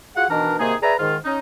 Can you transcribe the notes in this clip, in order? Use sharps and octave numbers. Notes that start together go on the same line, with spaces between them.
F4 F#4 G#4 F#5
B2 D#3 E3 D4 A#4
C3 D#3 A#3 D#4 G#4
G#4 B4 D5 E5 G#5 A#5
G#2 D#3 F4
C#4 D#4